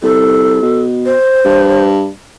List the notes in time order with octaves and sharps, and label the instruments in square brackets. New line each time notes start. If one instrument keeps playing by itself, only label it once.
[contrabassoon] C2 [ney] A4
[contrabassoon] B2
[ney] C5
[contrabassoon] G2